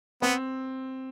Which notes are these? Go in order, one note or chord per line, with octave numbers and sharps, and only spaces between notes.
B3 C4